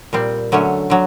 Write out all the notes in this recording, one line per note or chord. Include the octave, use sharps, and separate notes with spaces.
A#2 G3 C4
D3 F#3 A3 C#4
D3 F#3